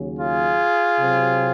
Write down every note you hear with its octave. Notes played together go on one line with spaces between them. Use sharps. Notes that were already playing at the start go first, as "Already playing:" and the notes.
Already playing: D#2 C#3 F#3
F4 G#4
C3 F#3 C4